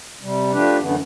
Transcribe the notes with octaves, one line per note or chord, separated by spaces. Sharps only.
C3 G3
F3 A3 D4 G4 B4
F#2 D3 E3 A3 B3